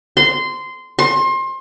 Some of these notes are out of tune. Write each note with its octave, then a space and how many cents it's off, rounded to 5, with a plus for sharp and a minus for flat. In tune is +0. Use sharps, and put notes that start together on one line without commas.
C6 -15
C6 +30